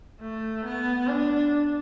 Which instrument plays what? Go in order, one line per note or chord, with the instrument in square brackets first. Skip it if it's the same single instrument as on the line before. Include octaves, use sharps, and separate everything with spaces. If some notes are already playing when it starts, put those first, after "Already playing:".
[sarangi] A3
B3
D4